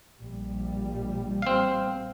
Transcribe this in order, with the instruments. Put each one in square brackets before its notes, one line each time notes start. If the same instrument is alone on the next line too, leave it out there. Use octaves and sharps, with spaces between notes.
[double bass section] A#1 G3
[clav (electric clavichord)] C4 F5